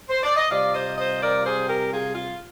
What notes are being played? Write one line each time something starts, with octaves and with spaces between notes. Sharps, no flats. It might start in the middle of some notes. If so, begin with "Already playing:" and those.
C5
D5
D#5
C3 G3 C4 F4 D5 F5
C5 D#5
C5 D#5
A#4 D5
G#4 C5
G4 A#4
F4 G#4
F4